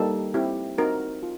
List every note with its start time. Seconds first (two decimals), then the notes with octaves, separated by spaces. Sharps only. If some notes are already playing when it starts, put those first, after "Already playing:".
Already playing: G3 A#3 D#4 G4 A4
0.34 C4 E4 G4
0.78 C4 D#4 F#4 A#4
1.23 F4